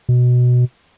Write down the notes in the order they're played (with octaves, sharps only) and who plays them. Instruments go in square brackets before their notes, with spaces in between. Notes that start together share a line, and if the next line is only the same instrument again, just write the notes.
[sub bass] B2